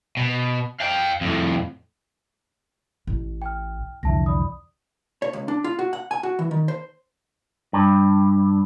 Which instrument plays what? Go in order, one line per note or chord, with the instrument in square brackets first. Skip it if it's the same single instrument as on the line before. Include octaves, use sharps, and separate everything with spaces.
[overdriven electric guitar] B2
F5 G5
F2 A2
[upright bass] A1
[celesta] G5 F6
[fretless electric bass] C2 F2 D3 [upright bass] E3 [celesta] E5 A5 A#6
[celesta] D5 B5 D#6
[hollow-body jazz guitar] C#5
C#2
D4
F4
F#4
F#5
G#5
F#4
E3
D#3
C5
[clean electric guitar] G2